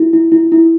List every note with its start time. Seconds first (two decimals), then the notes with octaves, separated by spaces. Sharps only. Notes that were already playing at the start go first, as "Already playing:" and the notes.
Already playing: E4
0.13 E4
0.32 E4
0.52 E4